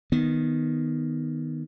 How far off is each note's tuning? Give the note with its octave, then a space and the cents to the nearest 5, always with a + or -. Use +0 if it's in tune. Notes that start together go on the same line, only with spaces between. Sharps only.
D#3 +0 B3 +0